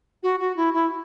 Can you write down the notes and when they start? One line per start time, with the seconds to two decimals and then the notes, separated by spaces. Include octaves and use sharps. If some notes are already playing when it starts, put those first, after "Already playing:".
0.23 F#4
0.40 F#4
0.56 E4
0.74 E4